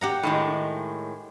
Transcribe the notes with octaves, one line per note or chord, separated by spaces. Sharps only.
G4 F#5 A#5
A2 D#3 G#3